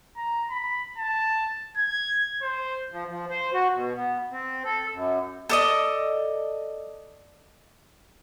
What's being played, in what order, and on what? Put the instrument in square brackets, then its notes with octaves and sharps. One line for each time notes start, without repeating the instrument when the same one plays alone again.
[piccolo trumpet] A#5
B5
A5
G#6
C5
[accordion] F3
F3
C5
F#4
B2
B3
C4
A4
F#2
[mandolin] A4 D5 D#5